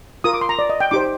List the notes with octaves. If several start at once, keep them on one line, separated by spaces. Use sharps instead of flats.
F4 A#4 D#6
D6
C6
A#5
D5
D#5
G5
D#4 G4 C5 D6